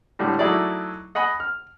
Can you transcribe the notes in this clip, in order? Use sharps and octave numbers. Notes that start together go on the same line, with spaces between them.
A2 D3 G3
F#3 A3 D#4 E4 G#4 D5
D#5 F#5 G#5 B5
F6